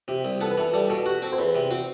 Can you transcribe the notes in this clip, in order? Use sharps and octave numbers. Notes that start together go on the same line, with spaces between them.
C3 G4
C2
B3 A4
B4
E3 A4
G3 A4
B2 A4
F#4 G4
C4 A4
C5
E2 B4
C3
C4 F#4